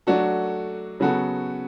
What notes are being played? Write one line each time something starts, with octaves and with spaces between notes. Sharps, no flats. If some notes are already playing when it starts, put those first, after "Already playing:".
F#3 A3 D4 F#4 A4
C#3 F#3 B3 F#4 A4